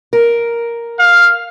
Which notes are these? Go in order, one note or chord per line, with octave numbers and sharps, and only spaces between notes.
A#4
F5